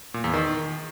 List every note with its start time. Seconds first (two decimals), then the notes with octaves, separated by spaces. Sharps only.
0.14 A#2
0.24 E2
0.33 D#3